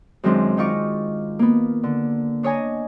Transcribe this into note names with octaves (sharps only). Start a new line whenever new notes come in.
F#2 D#3 G#3 C4 D4
D#3 D#4 F4 C#6 D6
A#3 B3
D3
D4 C#5 D#5 G#5 A#5